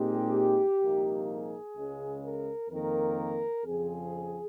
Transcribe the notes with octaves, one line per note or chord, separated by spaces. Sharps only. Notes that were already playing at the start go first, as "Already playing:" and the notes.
Already playing: A#2 G#3 C4 D#4 G4
C2 A#2 F3 A#3 D#4
G#4
C#2 C#3 G#3
A#4
F2 D#3 A#3 A#4
F2 C#3 F3 C4 G#4